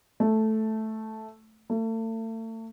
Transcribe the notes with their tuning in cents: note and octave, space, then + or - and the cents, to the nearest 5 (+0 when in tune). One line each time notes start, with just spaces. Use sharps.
A3 -5
A3 +35